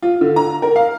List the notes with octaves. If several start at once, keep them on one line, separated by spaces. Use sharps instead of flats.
F4
D3
A#5
A#4
F5